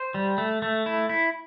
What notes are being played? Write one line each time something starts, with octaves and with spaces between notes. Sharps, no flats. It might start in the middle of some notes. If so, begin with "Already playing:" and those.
Already playing: C5
G3
A3
A3
E4
E4